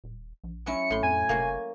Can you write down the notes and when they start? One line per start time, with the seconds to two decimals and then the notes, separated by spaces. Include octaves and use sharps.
0.04 D#1
0.44 A#1
0.66 F#3 C#4 E4 C#7
0.90 A1 A2 C6
1.03 F2 G#5
1.29 F1 A#3 F#4 C#5